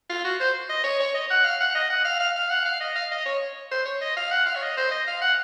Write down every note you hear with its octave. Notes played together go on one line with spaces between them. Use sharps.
F4
F#4
C5
D#5
C#5
C#5
D#5
F#5
F5
F#5
D#5
F#5
F5
F5
F5
F#5
F5
D#5
F5
D#5
C#5
C5
C#5
D#5
F5
F#5
F5
C#5
D#5
C5
D#5
F5
F#5